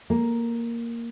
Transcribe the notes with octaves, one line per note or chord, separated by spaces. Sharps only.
A#3